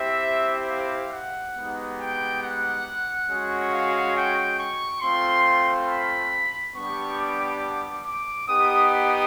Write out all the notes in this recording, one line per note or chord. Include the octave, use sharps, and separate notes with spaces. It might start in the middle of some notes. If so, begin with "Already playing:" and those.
Already playing: C4 E4 G4 E5
F5
F#5
G#3 B3 D#4 G4
G5
F#5
G#3 C#4 F#4
F5
G5
C#6
A3 C4 F4 C6
B5
G3 B3 D4 G4 C#6
D6
D6
B3 D#4 G4 D#6
D#6